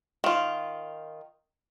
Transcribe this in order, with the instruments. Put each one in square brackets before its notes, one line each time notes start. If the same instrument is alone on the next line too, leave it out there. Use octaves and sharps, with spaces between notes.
[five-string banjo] D#3 F4